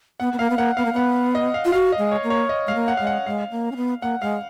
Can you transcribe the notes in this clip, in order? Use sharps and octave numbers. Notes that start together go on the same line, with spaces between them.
B3 F#5
B3
A#3 F5
B3
A#3 F#5
B3 F5
A#3
B3 F#5
D#5
F5
F4
F#4 F5
D#5
G#3
C#5
A#3
C#5
D#5
G#3 F5
A#3
F#5
G#3 F5
F#5
G#3 F5
A#3
C#4
B3
A#3 F#5
G#3 F5